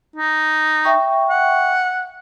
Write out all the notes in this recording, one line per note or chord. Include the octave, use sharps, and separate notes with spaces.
D#4
E5 G5 C#6
F#5